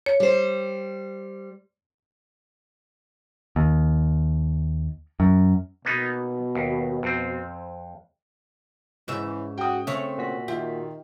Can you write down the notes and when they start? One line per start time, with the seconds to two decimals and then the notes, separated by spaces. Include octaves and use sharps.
0.06 C#5
0.20 G3 C5
3.56 D#2
5.20 F#2
5.85 B2 A#3 B3 D#4
6.55 D#2
7.03 F2 C4
9.08 G#2 C#3 E3 E5
9.58 F#4 G5 D#6
9.87 C#3 A3 C4 C#5 E5
10.18 A#2 F#4 B6
10.48 D#3 F4 G4 E5